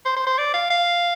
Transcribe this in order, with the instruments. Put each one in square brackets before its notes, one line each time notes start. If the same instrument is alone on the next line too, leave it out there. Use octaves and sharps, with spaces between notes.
[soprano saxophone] C5
C5
C5
D5
F5
F5